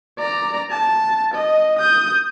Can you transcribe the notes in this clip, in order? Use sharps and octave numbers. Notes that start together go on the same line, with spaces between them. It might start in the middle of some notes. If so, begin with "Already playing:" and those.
D5 A#5
A5
D#5
D#6 G6